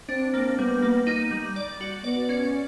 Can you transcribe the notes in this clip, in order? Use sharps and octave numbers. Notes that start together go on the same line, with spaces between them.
C4 D4
A#3
G3 B3
A#3
D#4
G3
D5
F#4
B3 D5
C#4